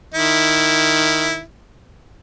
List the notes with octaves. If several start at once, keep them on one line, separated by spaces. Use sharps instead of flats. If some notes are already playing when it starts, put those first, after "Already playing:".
D#3 E4